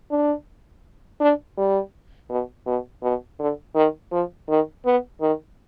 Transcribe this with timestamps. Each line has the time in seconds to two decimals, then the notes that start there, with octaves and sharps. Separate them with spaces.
0.11 D4
1.21 D4
1.58 G3
2.30 B2
2.67 B2
3.03 B2
3.40 D3
3.75 D#3
4.12 F3
4.49 D#3
4.85 B3
5.21 D#3